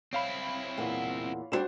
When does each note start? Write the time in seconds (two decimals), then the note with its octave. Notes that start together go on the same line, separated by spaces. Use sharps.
0.13 C4 E4 C#5 F5 B5
0.78 E2 A#2 F#5
1.52 D3 G3 D4 F#4 C5 E7